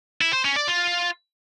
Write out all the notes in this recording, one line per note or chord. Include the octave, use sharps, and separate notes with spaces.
E4
C5
C#4
D5
F4